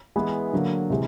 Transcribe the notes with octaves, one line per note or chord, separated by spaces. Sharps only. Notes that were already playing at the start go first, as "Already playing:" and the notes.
E3 G#3 B3 E4
D3 F#3 A#3
C3 E3 G#3